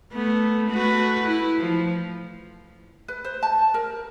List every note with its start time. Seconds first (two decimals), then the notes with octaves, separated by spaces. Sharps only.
0.12 A3 B3
0.69 A3 F#4 B4
1.24 E4
1.58 F3
3.08 B4
3.25 C5
3.43 A5
3.74 A#4